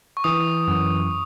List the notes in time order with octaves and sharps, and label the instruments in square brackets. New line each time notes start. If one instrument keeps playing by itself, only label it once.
[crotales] C#6
[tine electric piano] E3 [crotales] D#6
[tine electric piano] F#2